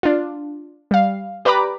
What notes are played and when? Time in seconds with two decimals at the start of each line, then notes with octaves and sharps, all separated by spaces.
0.03 D4 F4
0.91 G3 F5
1.45 G4 B4 D5 A#5 B5 D6